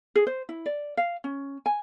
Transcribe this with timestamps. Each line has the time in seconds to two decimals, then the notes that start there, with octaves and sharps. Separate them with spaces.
0.15 G#4
0.27 C5
0.49 E4
0.66 D5
0.97 F5
1.24 C#4
1.66 G#5